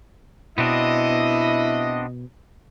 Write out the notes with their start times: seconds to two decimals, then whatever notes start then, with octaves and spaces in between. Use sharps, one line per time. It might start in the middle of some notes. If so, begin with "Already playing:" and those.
0.58 B2 B3 C4 D4 E4 D#5